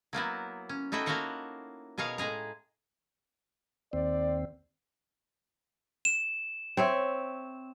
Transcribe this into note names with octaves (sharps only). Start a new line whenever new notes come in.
F#3 A#3 B3 E4
C#4
A3 D#4 E4 F#4 G5
A#3 F#4 A4 A#4 C#5 F#5
B2 G#4 A#4 C#5 F5
A2 G#3 G#4 A#5
D#2 C4 D5
E7
C4 C#5 E5